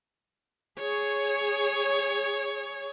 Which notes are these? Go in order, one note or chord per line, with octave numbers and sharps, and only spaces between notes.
G#4 C#5